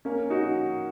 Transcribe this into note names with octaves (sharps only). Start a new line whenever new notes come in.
A#3 C#4
D#4 F#4